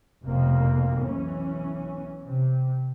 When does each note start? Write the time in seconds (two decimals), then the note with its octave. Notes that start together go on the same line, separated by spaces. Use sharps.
0.25 F1 F2 B2 A#3
0.99 B1 E3 C#4
2.24 C3